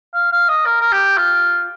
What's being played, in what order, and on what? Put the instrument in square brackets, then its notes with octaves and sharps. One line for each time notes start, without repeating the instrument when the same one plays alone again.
[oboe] F5
F5
D#5
A#4
A#4
G4
F4